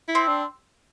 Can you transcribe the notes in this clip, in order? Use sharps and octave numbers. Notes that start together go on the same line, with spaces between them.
E4
C4
D4